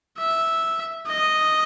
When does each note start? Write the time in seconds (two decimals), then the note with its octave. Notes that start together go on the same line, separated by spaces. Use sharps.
0.18 E5
1.08 D#5